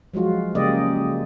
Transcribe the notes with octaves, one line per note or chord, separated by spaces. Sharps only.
F3 F#3 G#3 F4 F#4
C#3 G#3 A#3 G4 D5 D#5